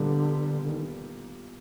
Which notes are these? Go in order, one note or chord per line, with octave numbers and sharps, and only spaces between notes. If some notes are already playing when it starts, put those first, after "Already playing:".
Already playing: A#2 D3 G3 B3
D3
D#3